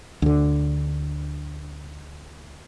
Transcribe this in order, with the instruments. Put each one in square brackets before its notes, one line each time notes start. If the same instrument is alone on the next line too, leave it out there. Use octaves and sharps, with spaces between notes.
[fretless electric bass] D2 D3